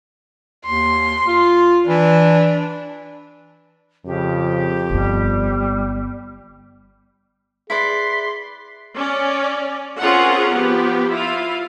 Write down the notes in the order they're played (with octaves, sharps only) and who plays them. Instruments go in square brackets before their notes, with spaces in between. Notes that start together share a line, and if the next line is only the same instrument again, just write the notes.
[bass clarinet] D#2 [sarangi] C6
[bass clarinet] F4
[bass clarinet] E3 [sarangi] D4
[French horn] F2 [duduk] C#3 [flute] G4
[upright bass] G1 B3 [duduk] G3
[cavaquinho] E4 B4 D5 [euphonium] G#4 [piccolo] C6 [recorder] B6
[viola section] C#4 D5
C4 C#4 F4 G#4 A#4 F#5
F3 B3 G4
E4 F4 F5